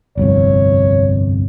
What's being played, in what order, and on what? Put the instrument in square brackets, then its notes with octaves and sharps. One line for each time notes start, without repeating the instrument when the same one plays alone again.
[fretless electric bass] G1 C2 F2 [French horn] C#5